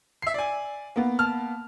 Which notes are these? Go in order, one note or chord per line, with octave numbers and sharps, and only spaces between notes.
E5 C7
D5 G#5
A#3 B3
A5 F6